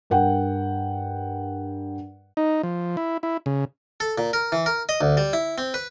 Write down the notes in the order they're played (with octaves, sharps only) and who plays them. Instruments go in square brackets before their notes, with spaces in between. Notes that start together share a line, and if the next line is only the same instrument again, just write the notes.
[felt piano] G2 A#4 F#5 G5
[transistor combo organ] D#4
F3
E4
E4
C#3
[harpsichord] A4
A#2
A#4
E3
A#4
D#5
D2
G3
E4
C4
B4